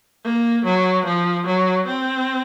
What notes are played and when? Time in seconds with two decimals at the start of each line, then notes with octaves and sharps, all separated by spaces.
0.24 A#3
0.65 F#3
1.06 F3
1.47 F#3
1.87 C4